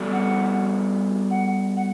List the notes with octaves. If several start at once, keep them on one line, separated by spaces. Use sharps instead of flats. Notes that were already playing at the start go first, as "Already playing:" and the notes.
Already playing: G3 B3 F#4 A4 D5
F#5
F#5
F#5